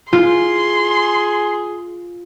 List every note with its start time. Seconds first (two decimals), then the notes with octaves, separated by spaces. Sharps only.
0.13 F4 G#4 C6